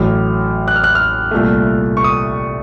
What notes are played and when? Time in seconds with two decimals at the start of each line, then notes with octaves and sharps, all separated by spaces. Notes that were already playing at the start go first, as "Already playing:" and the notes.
Already playing: A1 A2 F#3 F6
0.68 F#6
0.76 F6
0.84 F#6
0.95 F6
1.31 C2 A#2 A3
1.97 C#6
2.04 D#6